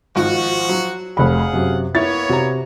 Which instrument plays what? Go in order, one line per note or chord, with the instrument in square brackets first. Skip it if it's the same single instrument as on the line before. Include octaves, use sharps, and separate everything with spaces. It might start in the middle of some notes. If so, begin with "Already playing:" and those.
[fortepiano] G#1 F4 [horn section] F3 F#4
[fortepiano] F#3
[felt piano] F1 B5 [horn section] G#4 F5 F#5
[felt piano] F#2 C3
[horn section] A#3 B3 C#5 [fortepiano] E4 [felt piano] A6
[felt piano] C3 [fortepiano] F#4 A#5